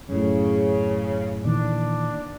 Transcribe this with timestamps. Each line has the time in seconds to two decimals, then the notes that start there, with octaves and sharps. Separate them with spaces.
0.09 F#2 A2 C#3
1.45 A#2 D#3 E3 D4